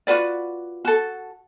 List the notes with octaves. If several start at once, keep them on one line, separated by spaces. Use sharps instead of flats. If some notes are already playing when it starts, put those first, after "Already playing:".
F4 F#4 B4 D5
F#4 A4